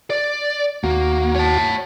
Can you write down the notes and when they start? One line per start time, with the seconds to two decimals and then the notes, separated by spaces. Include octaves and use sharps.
0.10 D5
0.84 D#2 A#3 F#4
1.36 C#5 A5